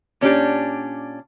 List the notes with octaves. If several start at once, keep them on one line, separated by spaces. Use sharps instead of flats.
A#2 C#4 D4 G4